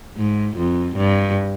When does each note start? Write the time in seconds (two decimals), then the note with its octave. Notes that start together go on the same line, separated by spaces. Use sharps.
0.17 G#2
0.58 F2
0.97 G2